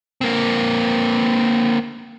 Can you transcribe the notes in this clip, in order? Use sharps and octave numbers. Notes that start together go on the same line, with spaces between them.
A#3 C4